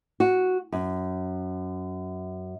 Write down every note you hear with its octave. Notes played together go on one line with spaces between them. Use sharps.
F#4
F#2